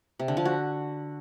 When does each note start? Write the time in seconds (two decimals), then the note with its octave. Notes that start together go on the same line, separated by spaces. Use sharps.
0.19 C3
0.28 D3
0.37 F3
0.45 F#4